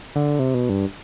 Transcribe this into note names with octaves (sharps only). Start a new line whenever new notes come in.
D3
C3
B2
G2